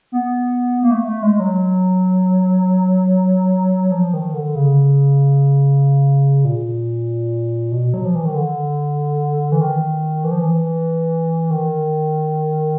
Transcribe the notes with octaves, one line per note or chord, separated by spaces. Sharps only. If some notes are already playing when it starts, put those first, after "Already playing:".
B3
A#3
A3
A3
G#3
F#3
F3
D#3
D3
C#3
A#2
B2
F#3
F3
E3
D#3
D3
E3
D#3
E3
F3
E3
D#3